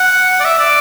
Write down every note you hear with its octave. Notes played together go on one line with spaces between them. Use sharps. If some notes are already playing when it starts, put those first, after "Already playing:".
Already playing: F#5
D5
E5
D5